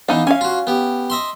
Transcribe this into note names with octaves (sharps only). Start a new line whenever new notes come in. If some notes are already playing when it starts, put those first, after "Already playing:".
E3 B3 D#4 F5
C#4 F5 G#5
F4 F#4
B3 G4
D#5 E5 C6